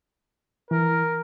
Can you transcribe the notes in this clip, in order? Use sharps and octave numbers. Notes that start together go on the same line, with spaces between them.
E3 A#4